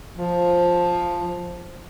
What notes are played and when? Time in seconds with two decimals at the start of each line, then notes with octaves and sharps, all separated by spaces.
0.19 F3